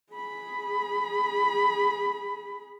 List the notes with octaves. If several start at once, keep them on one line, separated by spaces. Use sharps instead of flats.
G#4 B5